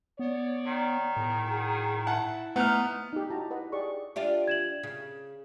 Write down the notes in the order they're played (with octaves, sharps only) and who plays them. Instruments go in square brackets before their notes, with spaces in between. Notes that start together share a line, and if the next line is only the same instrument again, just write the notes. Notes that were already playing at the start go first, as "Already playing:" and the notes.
[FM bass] B3 [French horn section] C#5 D5
[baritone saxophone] D#3
[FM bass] A2 [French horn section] G#4 A#4
[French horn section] F#4 G#4
[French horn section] E4 [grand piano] F#5 A5
[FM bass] A3 [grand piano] B3 F6 [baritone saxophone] D#4
[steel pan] D#4 G4
E4 F#4 A5 A#5
B4 D#5 F#5
G4 G#4 D5 C#6
[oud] D4 F4 G4 [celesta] E5
[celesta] G#6 E7 F#7
[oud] C#3